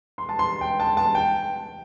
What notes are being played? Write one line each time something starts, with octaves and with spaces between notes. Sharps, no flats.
C6
A5
C6
G5
A5
A5
G5